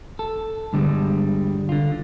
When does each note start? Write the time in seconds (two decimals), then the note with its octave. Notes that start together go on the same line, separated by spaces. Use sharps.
0.19 A4
0.73 G2 D3 G3 G#3
1.69 D3 F4